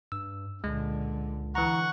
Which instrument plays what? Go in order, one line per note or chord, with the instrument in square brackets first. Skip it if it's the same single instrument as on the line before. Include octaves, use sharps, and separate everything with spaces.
[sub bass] G2 [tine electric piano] E6
[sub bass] C#2 [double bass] A#2 D3 [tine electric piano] G#3
[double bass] D3 [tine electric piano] E3 A#5 [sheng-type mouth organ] F#5 C#6